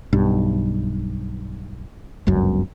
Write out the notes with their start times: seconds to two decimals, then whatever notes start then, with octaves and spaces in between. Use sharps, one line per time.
0.13 B1 G2
2.27 G1 C#2 F#2